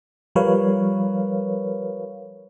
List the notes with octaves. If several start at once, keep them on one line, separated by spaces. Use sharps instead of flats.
F3 G3 A#4 B4 C#5 F5